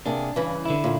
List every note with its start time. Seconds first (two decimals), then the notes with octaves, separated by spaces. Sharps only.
0.06 C3 A#3 D4 G#4
0.36 G2 C#3 E3
0.65 D3 E4
0.84 A#2 C#3